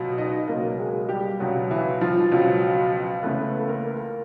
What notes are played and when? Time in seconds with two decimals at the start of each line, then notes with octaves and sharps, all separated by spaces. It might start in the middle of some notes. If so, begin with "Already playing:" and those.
Already playing: C#2 B2 F#3
0.18 D#4 D#5
0.48 C#2 B2 F#3 A#3 A#4
0.79 G#3 G#4
1.09 G3 G4
1.40 C#2 B2 F#3 F#4
1.70 E3 E4
2.01 F3 F4
2.32 C#2 B2 F#3
3.23 C#2 C#3 E3 A3 B3 B4
3.59 A4
3.69 A#3 A#4